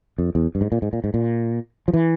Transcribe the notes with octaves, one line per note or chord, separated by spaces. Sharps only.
F2
E2
G2
G#2
A#2
G#2
A#2
G#2
A#2
F3
E3